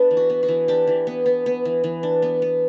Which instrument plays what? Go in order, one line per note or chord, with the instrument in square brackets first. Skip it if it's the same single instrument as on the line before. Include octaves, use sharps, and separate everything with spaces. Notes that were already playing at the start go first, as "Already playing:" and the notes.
Already playing: [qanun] B3 D4 B4
E3
F#4
B3
F#4
E3
D4 G4
E3
B3
B3
B3
E3
E3
D4
B3
B3